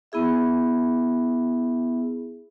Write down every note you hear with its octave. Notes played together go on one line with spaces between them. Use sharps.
B3 E4 G#4 E5